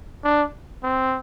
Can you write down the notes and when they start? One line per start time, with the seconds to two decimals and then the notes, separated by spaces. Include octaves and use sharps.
0.24 D4
0.83 C4